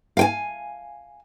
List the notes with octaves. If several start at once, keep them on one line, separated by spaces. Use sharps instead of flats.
F5 G5 G#5